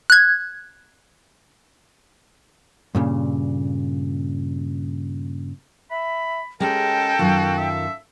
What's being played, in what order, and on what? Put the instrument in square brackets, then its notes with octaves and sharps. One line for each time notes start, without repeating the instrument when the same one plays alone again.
[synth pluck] F#6 G#6
[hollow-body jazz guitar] G2 A#2 C#3
[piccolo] E5 [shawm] B5
[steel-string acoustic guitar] G#3 C#4 G4 [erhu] A4 [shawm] A#4 [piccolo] G5
[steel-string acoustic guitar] F#2 D#3 F4 [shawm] F#4
[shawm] E5